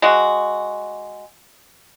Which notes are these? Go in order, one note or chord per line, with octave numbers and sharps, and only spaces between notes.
G#3 F#4